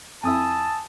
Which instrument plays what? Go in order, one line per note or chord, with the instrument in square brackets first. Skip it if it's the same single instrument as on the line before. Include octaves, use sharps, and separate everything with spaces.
[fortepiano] F2 E4 [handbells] G#5 D#6 E6 [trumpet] A5